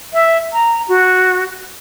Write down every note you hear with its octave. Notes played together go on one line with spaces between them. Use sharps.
E5
A#5
F#4